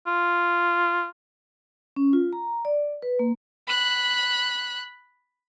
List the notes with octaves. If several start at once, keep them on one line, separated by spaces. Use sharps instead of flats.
F4
C#4
F4
A#5
D5
B4
A#3
B5 F#6